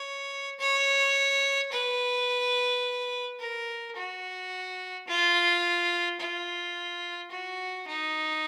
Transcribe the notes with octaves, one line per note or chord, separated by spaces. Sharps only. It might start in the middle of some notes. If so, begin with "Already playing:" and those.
Already playing: C#5
C#5
B4
A#4
F#4
F4
F4
F#4
D#4